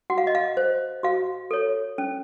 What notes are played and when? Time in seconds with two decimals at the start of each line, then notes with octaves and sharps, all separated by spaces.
0.10 F#4 F#5
0.18 F5
0.27 D#5
0.35 F5
0.57 C5
1.03 F#4 F5
1.51 A4 C#5
1.98 C#4